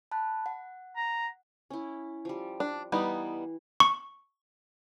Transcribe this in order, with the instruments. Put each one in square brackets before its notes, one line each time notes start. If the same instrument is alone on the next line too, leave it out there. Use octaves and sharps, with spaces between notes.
[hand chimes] A5 B5 F#6
F#5
[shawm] A#5
[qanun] C#4 E4
F3 G3
[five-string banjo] D4
[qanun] E3 B5 [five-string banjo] G3 B3 D#4
[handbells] C#6